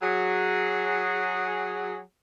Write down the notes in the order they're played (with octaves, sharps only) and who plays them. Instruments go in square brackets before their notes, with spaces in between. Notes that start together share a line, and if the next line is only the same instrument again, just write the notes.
[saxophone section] F#3 G#4